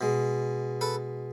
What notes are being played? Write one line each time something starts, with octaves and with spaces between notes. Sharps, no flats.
B2 G#3
A4 B4